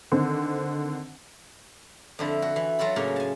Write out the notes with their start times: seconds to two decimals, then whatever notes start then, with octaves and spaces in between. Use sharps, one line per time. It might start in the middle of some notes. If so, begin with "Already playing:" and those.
0.12 D3 D#3 C4
2.19 F2 D3 E4
2.42 F#4
2.56 E3
2.79 F#3 F4 F#4 A4 B5
2.96 A2 C#3 A#3
3.16 G#5 A5